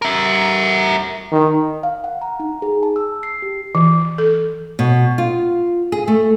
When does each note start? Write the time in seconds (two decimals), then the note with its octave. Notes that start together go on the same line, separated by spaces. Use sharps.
0.02 A#4 E5
1.32 D#3
1.83 F5
2.04 F#5
2.21 A#5
2.40 D#4
2.62 G#4
2.83 A5
2.96 E6
3.23 C7
3.42 G4
3.75 E3
4.18 A4
4.79 B2
5.18 F4
5.92 G#4
6.08 A3